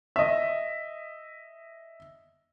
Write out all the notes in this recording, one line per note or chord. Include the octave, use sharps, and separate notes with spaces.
D#5 E5